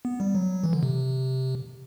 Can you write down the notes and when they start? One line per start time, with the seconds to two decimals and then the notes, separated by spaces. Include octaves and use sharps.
0.05 B3
0.20 G3
0.35 F#3
0.64 E3
0.73 D3
0.83 C3